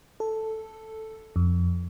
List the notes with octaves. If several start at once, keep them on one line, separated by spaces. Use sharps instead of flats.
A4
F2